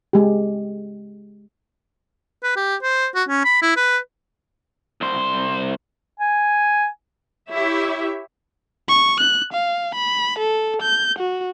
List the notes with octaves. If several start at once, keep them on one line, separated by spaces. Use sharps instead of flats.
G#3 G4
B4
G4
C5
F#4
C#4
B5
E4
B4
C2 C5
G#5
E4 G4 C#5 E5
C#6
F#6
F5
B5
A4
G6
F#4